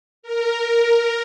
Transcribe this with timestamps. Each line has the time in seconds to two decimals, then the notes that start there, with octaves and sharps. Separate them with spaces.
0.23 A#4